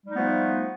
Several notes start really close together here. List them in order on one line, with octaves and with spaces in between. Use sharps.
G3 D#4 A3 B3 F3